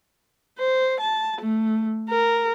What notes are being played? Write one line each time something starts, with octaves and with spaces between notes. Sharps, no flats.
C5
A5
A3
A#4